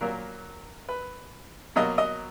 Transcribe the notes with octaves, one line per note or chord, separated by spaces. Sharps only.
A#2 F#3 A#3 A#4
B4
B2 F#3 A#3 D#5
D#5